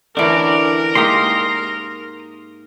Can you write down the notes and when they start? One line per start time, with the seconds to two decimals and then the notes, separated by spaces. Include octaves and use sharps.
0.17 D3 E3 C#4 D4 A#4 D5
0.95 G#2 A#3 G4 C6 D#6